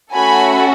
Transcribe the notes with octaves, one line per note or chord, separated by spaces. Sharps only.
A3 C#4 F#4 A4 G#5 B5